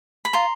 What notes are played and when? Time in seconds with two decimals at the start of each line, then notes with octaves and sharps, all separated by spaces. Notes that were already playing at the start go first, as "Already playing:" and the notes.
0.25 B5
0.33 F4 A#5 C6